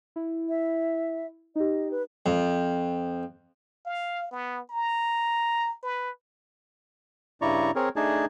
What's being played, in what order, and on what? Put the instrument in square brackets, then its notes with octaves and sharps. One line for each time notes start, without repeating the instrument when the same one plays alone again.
[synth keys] E4
[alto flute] E5
[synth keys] D#4 G4 [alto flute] D#5
[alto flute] B4
[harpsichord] F2
[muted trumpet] F5
B3
A#5
B4
[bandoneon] G2 C#3 E4 D5 A#5 C#6
C4 G#4 A#4 C#5
A3 D4 D#4 G#4 G#5 A5